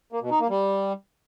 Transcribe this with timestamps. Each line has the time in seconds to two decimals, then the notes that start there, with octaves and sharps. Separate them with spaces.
0.12 A#3
0.22 B2
0.31 D#4
0.40 A#3
0.50 G3